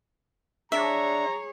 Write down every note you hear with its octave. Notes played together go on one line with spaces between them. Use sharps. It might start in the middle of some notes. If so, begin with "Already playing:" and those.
D4 G#4 C#5 E5 A#5